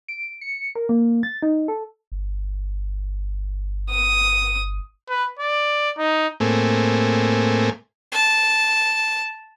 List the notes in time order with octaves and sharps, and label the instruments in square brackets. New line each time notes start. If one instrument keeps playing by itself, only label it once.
[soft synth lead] D7
C#7
A#4
A#3
A6
D#4
A4
[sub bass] G1
[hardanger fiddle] D#6
[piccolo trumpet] B4
D5
D#4
[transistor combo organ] A2 A3 A#3 C4 G#4
[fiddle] A5